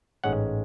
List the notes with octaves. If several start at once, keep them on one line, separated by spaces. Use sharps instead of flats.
A1 G#2 G#3 C#4 F#5